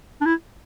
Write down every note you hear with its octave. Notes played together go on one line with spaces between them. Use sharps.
D4
E4